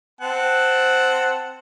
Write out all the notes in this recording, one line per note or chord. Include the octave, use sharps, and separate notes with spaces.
C4 F#5 A5